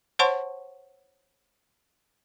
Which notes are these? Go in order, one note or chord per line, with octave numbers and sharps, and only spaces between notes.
C5 C#5 F#5 A5 C6 C#6